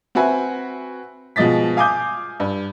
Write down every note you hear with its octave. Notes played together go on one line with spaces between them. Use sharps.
C4 F#4 B4 E5 G#5
B2 F3 G#3 D#5 A6 B6
F5 G#5 D6 D#6 G6
G2